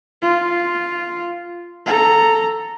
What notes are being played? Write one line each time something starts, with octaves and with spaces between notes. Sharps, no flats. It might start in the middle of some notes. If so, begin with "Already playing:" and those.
F4
A4 A#5